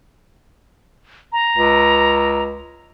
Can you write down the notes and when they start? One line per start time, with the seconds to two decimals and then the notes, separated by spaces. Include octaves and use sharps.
1.32 A#5
1.57 C#2